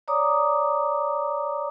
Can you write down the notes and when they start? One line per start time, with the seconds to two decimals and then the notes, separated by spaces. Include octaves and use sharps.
0.08 C#5 D5 A#5 D6 D#6